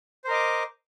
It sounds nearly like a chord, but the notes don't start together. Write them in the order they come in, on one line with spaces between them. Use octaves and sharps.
C5 A#4 D#5 D6